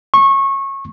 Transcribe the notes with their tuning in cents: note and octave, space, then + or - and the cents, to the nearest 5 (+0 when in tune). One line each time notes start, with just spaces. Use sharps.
C#6 -20